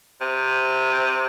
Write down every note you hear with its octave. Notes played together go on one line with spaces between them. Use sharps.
C3